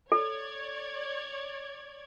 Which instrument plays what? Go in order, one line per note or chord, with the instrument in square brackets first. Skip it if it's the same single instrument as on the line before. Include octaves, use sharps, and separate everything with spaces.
[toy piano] A4 [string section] C#5 D5 G#6